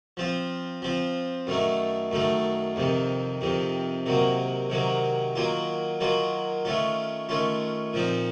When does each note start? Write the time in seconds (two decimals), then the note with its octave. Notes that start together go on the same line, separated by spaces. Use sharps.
0.17 F3 C4 F4
0.82 F3 C4 F4
1.47 F#2 D#3 A3 D#4
2.11 F#2 D#3 A3 D#4
2.76 F2 C3 D#3
3.41 F2 C3 D#3
4.06 C3 D#3 F#3 A#3
4.70 C3 D#3 F#3 A#3
5.36 D#3 F#3 A#3 F4
6.00 D#3 F#3 A#3 F4
6.65 D#3 A3 C#4 F4
7.29 D#3 A3 C#4 F4
7.93 A#2 F3 C4 D#4